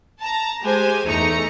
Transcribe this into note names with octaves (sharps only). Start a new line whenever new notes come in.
A5 A#5
G#3 G4 C5 G#5
E2 A3 D#4 A#5 C#7